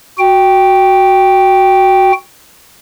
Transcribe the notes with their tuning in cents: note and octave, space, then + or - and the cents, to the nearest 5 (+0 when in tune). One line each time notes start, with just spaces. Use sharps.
F#4 +0 G5 +0